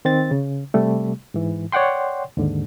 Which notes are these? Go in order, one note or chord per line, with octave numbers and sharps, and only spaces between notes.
D#3 C4 A6
C#3
C3 G3 A3
G#2 E3
C#5 D5 F#5 G5 C6
D#2 G#2 D3